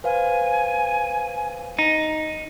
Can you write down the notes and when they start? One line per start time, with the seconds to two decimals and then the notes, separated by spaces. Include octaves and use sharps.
0.04 B4 C5 F5 G#5
1.79 D#4